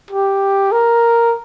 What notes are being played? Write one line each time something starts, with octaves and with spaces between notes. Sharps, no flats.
G4
A#4